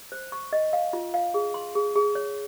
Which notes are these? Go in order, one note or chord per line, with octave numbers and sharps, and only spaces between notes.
C5
C#6
D#5
F5
F4
F5
G#4
C6
G#4
G#4
C#5